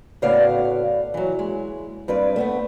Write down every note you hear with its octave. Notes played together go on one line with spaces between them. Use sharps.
A2 C#3 B3 F#4 D5 F5
E3 F#3
G#3
G2 C4 B4 D5
A3 B3 C4